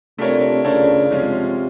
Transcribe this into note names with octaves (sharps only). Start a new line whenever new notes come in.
C3 A3 D4 F4 A#4 C#5
C#3 A3 D4 F4 A#4 C#5
C3 F3 G#3 C#4 F4